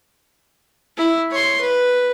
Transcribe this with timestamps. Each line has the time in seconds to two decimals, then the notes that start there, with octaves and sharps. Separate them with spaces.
0.97 E4
1.31 C#5 C6
1.61 B4